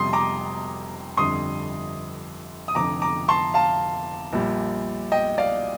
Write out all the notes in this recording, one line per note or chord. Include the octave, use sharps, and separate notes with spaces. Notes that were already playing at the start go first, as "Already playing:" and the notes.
Already playing: F1 F2 C3 G3 C6 D#6
A#5 D6
G1 F2 D3 G3 C6 D#6
D#6
F1 F2 D3 A#5 D6
A#5 D6
A5 C6
F5 A5
A#1 A#2 G3
D#5 G5
D5 F5